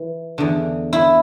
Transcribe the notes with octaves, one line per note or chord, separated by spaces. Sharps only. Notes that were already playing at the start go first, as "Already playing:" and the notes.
Already playing: E3
E2 D3
E4